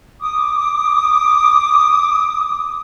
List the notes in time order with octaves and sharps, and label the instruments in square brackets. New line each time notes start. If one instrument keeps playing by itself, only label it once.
[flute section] D6 D#6